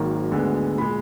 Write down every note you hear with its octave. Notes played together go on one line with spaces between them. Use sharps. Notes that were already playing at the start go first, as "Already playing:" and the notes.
Already playing: G#1 G#2 D#3 F#3 A#3
D2 D3 G#3 B3
A#2 G#3 B5